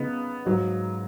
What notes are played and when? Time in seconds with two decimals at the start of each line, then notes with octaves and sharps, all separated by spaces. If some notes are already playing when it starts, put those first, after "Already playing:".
Already playing: C#3 B3 D#4
0.45 G#2 F#3 D#4